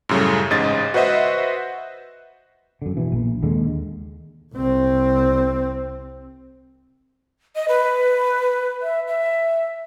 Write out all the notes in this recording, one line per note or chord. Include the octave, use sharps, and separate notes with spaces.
F#2 A2 C#3 G3 A3
A1 G#2 C#3 D#5 A6
F#4 B4 C5 D#5 E5 F#5
F#2 D3
B2 E3
A#1
D#2 D3 G#3
C2 C4
D#5
B4
E5
E5